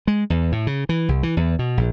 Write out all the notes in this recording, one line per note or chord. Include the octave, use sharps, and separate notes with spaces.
G#3
E2
A2
C#3
E3
C2
E3
E2
B2
A#1